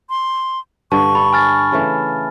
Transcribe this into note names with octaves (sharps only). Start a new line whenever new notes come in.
C6
G2 D3 A5 C#6
A4 B5
G#5 F6 A6
C#3 E3 A3